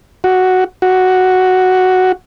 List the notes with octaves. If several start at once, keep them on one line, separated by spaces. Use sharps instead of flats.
F#4
F#4